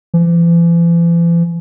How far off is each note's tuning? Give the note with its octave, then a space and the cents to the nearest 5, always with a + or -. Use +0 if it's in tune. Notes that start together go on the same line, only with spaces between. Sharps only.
E3 +45